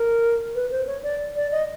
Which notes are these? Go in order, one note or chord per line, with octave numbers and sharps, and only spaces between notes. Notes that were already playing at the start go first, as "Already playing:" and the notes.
Already playing: A#4
B4
C5
C#5
D5
D5
D#5